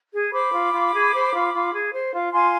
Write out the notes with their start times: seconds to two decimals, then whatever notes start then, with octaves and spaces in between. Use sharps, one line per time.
0.12 G#4
0.32 C5 B5 D6
0.53 F4
0.72 F4
0.92 G#4
1.13 C5
1.32 F4
1.53 F4
1.72 G#4
1.93 C5
2.13 F4
2.32 F4 G#5 C6